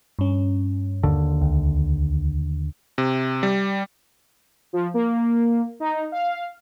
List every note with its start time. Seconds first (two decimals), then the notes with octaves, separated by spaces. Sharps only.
0.19 G2 C#4
1.03 D#2 D3
1.42 C#2
2.98 C3
3.43 G3
4.73 F3
4.94 A#3
5.80 D#4
6.12 F5